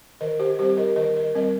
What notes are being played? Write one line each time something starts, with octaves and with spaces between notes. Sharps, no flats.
D#3 A#4 D#5
G4 C5
G3 C4 G4 C5
A#4 D#5
D#3 A#4 D#5
A#4 D#5
G3 C4 A#4 D#5